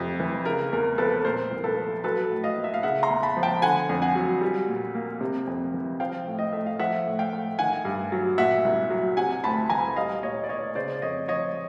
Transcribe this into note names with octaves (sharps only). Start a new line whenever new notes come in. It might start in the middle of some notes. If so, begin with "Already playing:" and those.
Already playing: F2 C3
E3
C#3 A#4
E2 A#4
F3 A4 B4
A#2 A#4 C5
C2
A4 B4
F3
F#3 A4 B4
A2
D#5 F5
A#3
E5
F5
C#3 E5 F#5
A#5 C6
E2
A5 B5
F3
G5 A5
D3 F#5 G#5
F2
F#5 G#5
F#3
G3
A#2
A#3
C3
F2
E3
F3 F5 G5
A2
D#5
A3 E5
F5
F3 E5 F#5
A2
F5 G5
A3
D#3 F#5 G#5
G2
F#3
A#2 E5 F#5
C2
F#3
C3 F#5 G#5
D2 A5 B5
E3 G#5 A#5
G3 D#5 F5
A#2 C#5 D#5
D5
B3 C#5 D#5
C#3 C5 D5
F2 C#5 D#5
F3 C#5 D#5